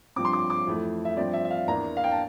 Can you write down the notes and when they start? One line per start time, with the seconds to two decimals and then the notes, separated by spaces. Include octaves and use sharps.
0.16 G2 F3 C4 D6
0.25 C6
0.33 D6
0.50 D6
0.67 F2 E3 A3
1.05 E5
1.17 G2 F3 C4 D5
1.33 E5
1.45 E5
1.50 F5
1.68 E2 E3 A#3 D4 A#5
1.97 F5
2.04 G5
2.11 A5